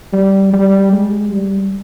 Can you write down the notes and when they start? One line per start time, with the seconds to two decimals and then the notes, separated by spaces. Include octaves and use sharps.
0.13 G3
0.53 G3
0.92 G#3
1.32 G3